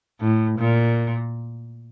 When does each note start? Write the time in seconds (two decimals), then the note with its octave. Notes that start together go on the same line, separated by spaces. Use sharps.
0.21 A2
0.59 A#2